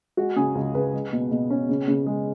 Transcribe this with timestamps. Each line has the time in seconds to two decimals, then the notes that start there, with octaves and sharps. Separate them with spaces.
0.17 G#3 F#4
0.36 C#3 G#4
0.55 C#2
0.74 C#2 B4
0.93 G#3
1.13 B2
1.31 B2
1.50 C#4
1.69 C#3
1.88 C#3
2.06 G#3